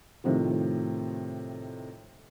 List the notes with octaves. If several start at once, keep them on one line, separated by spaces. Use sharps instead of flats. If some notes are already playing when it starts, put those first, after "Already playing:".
A2 C3 D#3 F3